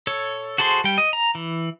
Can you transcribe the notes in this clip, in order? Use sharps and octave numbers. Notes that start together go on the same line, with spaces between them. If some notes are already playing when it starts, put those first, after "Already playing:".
A4 C#5
F#4 G#4 A4 C5 C6
G3 G5
D#5
A#5
E3